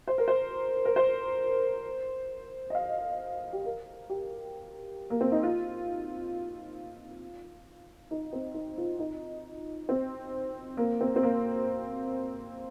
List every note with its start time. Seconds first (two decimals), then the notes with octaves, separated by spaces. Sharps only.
0.07 C5
0.18 A#4
0.28 C5
0.85 A#4
0.96 C5
2.70 D#5
2.75 F5
3.53 G4
3.65 A#4
4.09 G4
5.10 A#3
5.21 C4
5.32 D#4
5.43 F4
8.11 D#4
8.33 C4
8.54 D#4
8.78 F4
8.99 D#4
9.89 C4
10.77 A#3
11.01 C4
11.16 C4
11.23 A#3